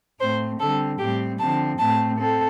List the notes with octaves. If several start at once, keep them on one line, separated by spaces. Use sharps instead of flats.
A2 A3 C4 C5
D3 G3 C4 A4
A2 G3 C4 G4
D3 F3 C4 A5
A2 A3 C4 A5
C4 A4